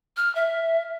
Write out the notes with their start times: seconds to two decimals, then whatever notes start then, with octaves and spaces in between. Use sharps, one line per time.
0.17 F6
0.35 E5